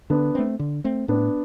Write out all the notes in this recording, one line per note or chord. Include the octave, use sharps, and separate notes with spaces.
D3 B3 D4
A3 C4
D3
A3 C4
A2 B3 D4